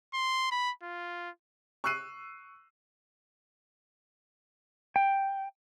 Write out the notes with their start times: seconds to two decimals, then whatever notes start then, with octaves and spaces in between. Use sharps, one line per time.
0.14 C6
0.52 B5
0.83 F4
1.84 C#6 E6 F#6 C7 D#7
4.96 G5